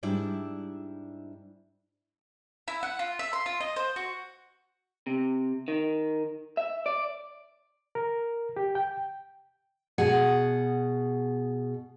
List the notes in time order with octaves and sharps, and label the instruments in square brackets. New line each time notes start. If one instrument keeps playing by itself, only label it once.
[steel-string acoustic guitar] G#2 G3 D4 E4 E5
[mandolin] E4
F#5
F4
E5
C6
F4
D#5
C5
F#4
[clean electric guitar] C3
D#3
E5
D5
[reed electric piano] A#4
G4
G5
[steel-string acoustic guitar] B2 G#4 F#5